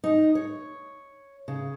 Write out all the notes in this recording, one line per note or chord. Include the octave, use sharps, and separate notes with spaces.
D#4
C#5
C#3